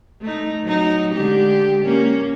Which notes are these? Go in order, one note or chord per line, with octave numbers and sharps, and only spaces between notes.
A3 D#4
F#3 D#4
D3 G#3 G4
A#3 C#4